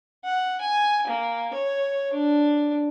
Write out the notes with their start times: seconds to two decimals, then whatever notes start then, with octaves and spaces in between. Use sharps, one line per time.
0.25 F#5
0.61 G#5
1.07 A#3
1.53 C#5
2.13 D4